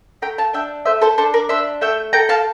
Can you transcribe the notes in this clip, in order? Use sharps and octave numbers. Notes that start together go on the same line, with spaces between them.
A3 G5 A#5
F5 A5
D4 E5 G5
A3 C5 E5
A4 C5
D4 A4 C5
A#4 D5
D4 C5 E5
A3 E5 G5
A4 G5 A#5
F5 A5